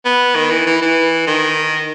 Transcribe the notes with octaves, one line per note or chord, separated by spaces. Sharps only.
B3
D#3
E3
E3
E3
D#3